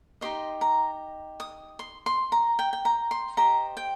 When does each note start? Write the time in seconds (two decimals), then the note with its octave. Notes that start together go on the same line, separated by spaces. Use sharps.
0.21 D#4 G4 C5 D#5 C6
0.61 A#5
1.40 D#6
1.79 C6
2.06 C6
2.32 A#5
2.59 G5
2.73 G5
2.85 A#5
3.11 C6
3.37 G4 C5 D#5 A#5
3.77 G5